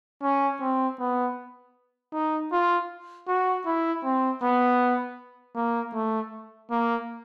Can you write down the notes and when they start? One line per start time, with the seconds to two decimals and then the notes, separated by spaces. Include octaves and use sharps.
0.23 C#4
0.61 C4
1.00 B3
2.13 D#4
2.52 F4
3.28 F#4
3.66 E4
4.04 C4
4.42 B3
5.56 A#3
5.94 A3
6.71 A#3